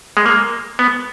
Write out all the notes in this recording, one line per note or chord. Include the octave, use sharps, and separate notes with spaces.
G#3
A#3
B3